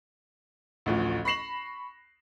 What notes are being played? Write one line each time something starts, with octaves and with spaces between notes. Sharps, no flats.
A1 D2 F3
B5 C#6 A#6 C7 E7 F#7